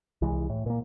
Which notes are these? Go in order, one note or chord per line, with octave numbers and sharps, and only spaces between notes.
C2 E3 G#3
A2
A#2 A#3